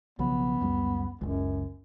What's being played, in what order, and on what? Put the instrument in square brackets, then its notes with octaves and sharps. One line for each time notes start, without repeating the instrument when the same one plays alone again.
[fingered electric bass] B1 C#3 F3 [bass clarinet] B3
[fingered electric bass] C#2 F#2 G3
[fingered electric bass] F#1 C#2 [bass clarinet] F#2